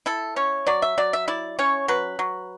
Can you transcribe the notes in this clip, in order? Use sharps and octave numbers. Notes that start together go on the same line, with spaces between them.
E4 A4
C#4 C#5
F#3 D5
E5
F#3 D5
E5
E4 D5
C#4 C#5
F#3 B4
F#3